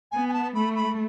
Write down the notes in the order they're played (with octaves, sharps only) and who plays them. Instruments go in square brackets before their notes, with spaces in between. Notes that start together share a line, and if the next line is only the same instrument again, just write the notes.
[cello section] B3 [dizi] G#5
[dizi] G#5
A5
[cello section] A3 [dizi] B5
[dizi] B5